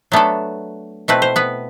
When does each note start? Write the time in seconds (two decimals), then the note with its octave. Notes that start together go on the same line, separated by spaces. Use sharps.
0.12 F#3 A3 B3 D4 A4
1.08 B2 A3 C4 E4 B4
1.22 C5
1.36 B3 B4